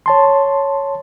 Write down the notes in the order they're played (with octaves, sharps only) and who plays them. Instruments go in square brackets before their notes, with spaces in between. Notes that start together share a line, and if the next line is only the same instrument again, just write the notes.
[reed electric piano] C#5 A5 C6